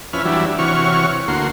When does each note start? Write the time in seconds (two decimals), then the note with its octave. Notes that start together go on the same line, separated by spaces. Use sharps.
0.13 F2 C#4 E4 B4 F6
0.25 E3 F#3 G3 D4 E4
0.59 C3 E3 F#4 C#5 C#6 F6
1.28 D2 A#3 F#4 C6